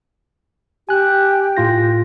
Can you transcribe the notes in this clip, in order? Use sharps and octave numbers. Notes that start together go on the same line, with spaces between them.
G4 G#5 F#6
A2 F4 A#6